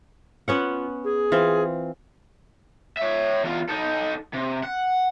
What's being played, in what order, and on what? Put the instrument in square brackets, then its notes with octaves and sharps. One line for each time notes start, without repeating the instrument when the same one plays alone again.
[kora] B3 C#4 F#5 [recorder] F4
[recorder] G#4
[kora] E3 C4 F4
[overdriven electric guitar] C#5 E5
E2 F4
D#4 A4
C3
F#5